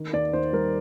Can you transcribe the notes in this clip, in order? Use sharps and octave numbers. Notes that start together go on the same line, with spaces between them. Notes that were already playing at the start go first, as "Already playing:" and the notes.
Already playing: D#3
D#2 D5
D#2 C5
G3 A#4